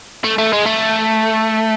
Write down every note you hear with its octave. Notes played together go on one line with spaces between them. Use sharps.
A3
A3
G#3
A3